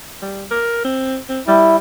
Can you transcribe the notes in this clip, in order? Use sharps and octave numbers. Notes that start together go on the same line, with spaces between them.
G3
A#4
C4
C4
G3 E4